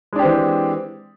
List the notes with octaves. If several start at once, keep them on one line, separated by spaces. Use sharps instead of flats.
E3 G#3 C4 D4 G4